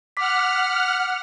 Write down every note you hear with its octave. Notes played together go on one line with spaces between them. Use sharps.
F#5 D6 F6 B6